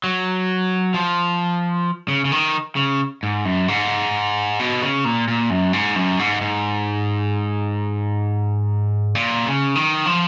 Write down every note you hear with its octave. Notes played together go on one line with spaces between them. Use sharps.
F#3
F3
C#3
C#3
D#3
C#3
G#2
F#2
G#2
B2
C#3
A#2
A#2
F#2
G#2
F#2
G#2
G#2
A#2
C#3
D#3
F3